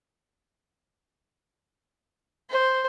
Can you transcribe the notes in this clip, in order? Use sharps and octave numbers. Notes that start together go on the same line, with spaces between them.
C5